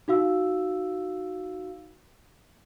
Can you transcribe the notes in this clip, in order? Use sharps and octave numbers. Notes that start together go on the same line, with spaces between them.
D#4 F#4 F5 E6